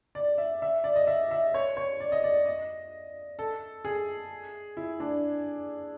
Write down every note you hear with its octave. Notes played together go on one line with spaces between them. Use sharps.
D5
E5
E5
D5
D#5
E5
E5
C#5
C#5
D5
D#5
D5
D#5
A4
G#4
E4
D4